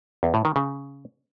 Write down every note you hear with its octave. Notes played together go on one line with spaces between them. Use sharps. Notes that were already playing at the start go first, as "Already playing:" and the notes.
E2
A2
D#3
C#3